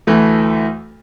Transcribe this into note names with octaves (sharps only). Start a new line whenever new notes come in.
D2 E3 A3